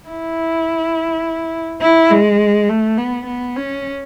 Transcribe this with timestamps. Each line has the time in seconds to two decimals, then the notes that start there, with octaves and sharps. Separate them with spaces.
0.08 E4
1.81 E4
2.11 G#3
2.69 A3
2.98 B3
3.26 B3
3.56 C#4